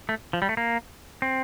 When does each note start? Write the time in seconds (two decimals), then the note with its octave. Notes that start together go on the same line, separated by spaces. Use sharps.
0.09 A3
0.33 F3
0.42 G3
0.49 A3
0.57 A#3
1.22 C4